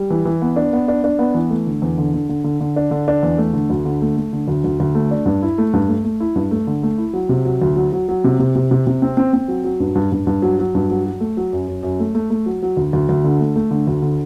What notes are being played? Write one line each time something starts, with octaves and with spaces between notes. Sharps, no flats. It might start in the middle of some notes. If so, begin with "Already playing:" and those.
Already playing: G3
E3
E3
B3
D4
B3
D4
D4
B3
E3
A3
D3
E2
D3
D3
D3
D3
D3
D4
D3
D4
E2
A3
D3
D2
D3
A3
A3
D3
D2
D2
D2
A3
D4
G2
E4
A3
G2
A3
A3
E4
G2
A3
D3
A3
E4
F#3
C3
F#3
D2
F#3
F#3
F#3
C3
C3
C3
C3
C3
C4
C4
C4
F#3
F#3
G2
G2
G2
G2
F#3
F#3
G2
F#3
F#3
A3
F#3
F#2
F#2
F#2
A3
A3
A3
F#3
F#3
D2
D2
D2
D3
A3
A3
D3
D2
D3